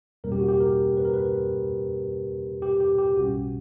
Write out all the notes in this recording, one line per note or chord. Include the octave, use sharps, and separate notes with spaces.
E2 B2 G3 A#3 C#4 A#4
G4
F#4
G4
A#4
B4
A#4
B4
G4
G4
G4
B1 B2 G3 C#4 F#4